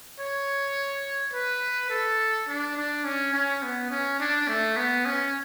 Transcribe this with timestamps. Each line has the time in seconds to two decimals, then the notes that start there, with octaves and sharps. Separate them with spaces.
0.20 C#5
1.34 B4
1.90 A4
2.48 D4
2.77 D4
3.05 C#4
3.34 C#4
3.63 B3
3.91 C#4
4.20 D4
4.48 A3
4.77 B3
5.06 C#4